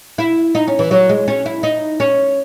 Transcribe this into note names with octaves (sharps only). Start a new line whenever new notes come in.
E4
D#4
C#4
E3
F#3
G#3
C#4
E4
D#4
C#4